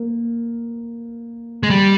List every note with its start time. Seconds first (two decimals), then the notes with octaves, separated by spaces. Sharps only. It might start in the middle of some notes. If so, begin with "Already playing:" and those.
Already playing: A#3
1.63 G#3
1.70 G3